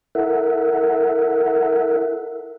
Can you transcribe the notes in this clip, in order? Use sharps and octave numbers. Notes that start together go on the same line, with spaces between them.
E4 A4 A#4 E5 F#5